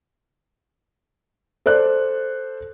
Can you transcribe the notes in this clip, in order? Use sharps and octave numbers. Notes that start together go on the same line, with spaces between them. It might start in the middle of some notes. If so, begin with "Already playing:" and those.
A4 C5 D5 F#6